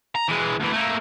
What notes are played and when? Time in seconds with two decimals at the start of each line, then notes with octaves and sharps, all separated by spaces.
0.15 A#5
0.28 E3 G#3
0.60 D2 E3
0.72 A3 A#3